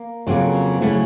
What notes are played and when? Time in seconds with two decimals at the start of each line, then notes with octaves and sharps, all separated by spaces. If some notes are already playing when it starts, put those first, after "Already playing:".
Already playing: A#3
0.27 F2 C#3 F#3 A#3
0.81 C#3 F#3 A3 C#4 E4